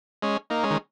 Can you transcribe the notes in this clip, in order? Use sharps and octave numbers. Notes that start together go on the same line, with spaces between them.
G#3 C#4
A#3 D#4
G#3 C#4
D#3